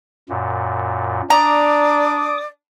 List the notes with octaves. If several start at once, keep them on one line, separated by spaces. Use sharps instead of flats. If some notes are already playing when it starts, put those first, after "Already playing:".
F#2 A#2
D4 D5 A#5 D6 D#6